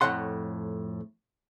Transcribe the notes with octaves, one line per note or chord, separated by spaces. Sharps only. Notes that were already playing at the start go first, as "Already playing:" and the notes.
F2 A2 C#5 F#5 C6